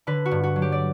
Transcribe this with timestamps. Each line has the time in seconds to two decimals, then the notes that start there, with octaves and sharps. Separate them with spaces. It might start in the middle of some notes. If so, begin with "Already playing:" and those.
0.07 D3 B4
0.25 F#4
0.31 G2
0.43 F#4
0.56 F#3
0.62 G4
0.72 D5